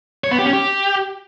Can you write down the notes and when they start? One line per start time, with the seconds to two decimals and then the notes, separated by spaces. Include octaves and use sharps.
0.24 C#5
0.31 B3
0.39 G4
0.46 C#4
0.53 G4